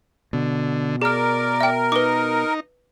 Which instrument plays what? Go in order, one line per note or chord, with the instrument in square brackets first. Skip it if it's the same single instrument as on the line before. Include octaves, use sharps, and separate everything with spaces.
[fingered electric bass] B2 [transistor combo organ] D3
[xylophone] G#4 F6 [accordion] A#4 [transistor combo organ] D5
[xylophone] E5 G5
[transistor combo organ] D#4 [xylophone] B4 D6